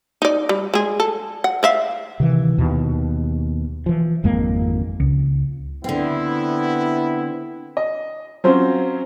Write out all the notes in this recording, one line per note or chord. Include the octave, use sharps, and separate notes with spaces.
D#4 D5
G3
G#3 G#4
A4
F#5
D5 E5 F5
C3 D#3 E3
D#2 B2
E3 F3
G#1 F2 G#3 A#3
C#2
D3 B3 C4 E4
D#5
F#3 C4 C#4 F4 C5